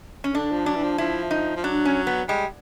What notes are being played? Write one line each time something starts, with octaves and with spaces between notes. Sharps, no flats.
C#4
D3 D4
F3
F#3 D4
E3
F3
F3 E4
D#4
F3
F#3 D4
C#4
B3
G3 G#3